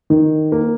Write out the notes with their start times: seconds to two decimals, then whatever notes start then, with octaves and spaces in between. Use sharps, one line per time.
0.10 D#3
0.52 A#3